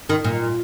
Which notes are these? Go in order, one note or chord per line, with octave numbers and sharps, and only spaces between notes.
D#3
A#2